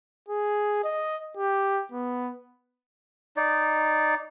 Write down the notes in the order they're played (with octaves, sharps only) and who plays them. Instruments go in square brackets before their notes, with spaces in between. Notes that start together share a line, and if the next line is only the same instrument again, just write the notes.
[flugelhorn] G#4
D#5
G4
B3
[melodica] D#4 D5